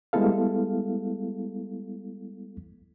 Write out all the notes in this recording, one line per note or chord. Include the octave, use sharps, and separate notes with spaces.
G3 G#3 B3 E4 A4 F5